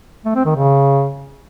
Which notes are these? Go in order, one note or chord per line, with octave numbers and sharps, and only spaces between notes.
A3
C4
D#3
C#3